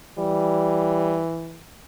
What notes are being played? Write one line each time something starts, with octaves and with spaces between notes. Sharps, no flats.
E3 G3